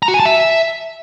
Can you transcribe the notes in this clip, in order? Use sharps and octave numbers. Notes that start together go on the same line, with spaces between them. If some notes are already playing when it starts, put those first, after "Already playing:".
A#5
F#4
G#5
A5
E5